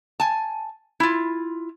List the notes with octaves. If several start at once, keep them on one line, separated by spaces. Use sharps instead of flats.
G#5 A5
E4 F4